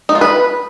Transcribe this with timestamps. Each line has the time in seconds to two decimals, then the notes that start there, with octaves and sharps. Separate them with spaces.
0.09 D#4
0.15 F4
0.21 B4